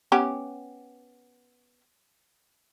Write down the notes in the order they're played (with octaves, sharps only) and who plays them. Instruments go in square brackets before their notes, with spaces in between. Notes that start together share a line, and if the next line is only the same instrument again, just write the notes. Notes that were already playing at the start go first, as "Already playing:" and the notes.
[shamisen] B3 C#4 G4